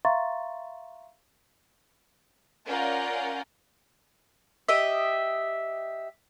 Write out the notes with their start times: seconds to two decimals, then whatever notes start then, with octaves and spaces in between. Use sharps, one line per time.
0.05 E5 F5 A#5 C6 C#6 A6
2.65 C#4 F4 A#4 D5 F#5 G6
4.69 G4 D#5 E5